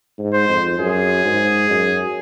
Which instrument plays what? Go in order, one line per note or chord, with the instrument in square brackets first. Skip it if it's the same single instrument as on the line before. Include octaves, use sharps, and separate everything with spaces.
[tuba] G#2
[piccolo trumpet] C5
[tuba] F2
[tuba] F#2 [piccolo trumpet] G#4
[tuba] G#2
F#2